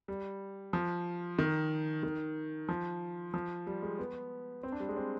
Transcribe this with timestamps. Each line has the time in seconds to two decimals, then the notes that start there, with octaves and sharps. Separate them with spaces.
0.08 G3
0.73 F3
1.39 D#3
2.03 D#3
2.69 F3
3.34 F3
3.67 G3
3.82 G#3
3.99 B3
4.63 C4
4.72 D4
4.80 G3
4.89 G#3
4.97 C4